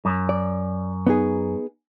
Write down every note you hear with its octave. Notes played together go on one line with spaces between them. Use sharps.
F#2
D5
B3 D#4 G#4